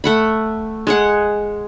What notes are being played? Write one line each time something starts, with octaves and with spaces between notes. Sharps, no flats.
A3 F#5 B5
G#3 G#4 F#5